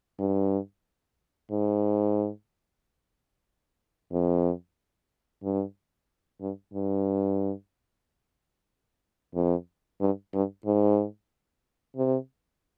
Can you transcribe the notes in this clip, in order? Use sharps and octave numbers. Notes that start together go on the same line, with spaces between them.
G2
G#2
F2
G2
G2
G2
F2
G2
G2
G#2
C3